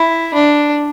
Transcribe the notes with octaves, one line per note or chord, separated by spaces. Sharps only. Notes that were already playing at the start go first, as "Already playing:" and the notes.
Already playing: E4
D4